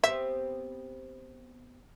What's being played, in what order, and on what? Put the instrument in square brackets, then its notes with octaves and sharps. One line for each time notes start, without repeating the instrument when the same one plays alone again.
[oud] B3 C4 G4 [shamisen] E5